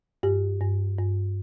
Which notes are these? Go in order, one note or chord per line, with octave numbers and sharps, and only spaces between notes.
G2 G4
G2
G2